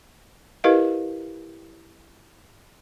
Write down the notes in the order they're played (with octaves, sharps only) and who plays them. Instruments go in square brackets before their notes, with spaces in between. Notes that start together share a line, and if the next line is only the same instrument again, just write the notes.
[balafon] E4 G4 A#4 B4 D#5 F5